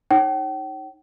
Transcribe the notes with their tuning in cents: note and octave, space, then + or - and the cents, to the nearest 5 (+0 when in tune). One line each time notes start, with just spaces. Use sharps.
D#4 +0 C#5 -30 G5 -40